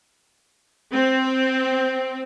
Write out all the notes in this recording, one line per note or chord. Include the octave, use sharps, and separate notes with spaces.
C4